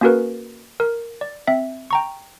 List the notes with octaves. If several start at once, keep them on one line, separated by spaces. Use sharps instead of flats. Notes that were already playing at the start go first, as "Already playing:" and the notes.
A#3 C#4 F#4 G#4 A#4 B4
A#4
D5
C4 E5
G5 A#5 C#6